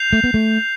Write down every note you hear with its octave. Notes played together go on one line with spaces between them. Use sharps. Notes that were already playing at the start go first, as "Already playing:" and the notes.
Already playing: G6 C7 F7
A3
B3
A3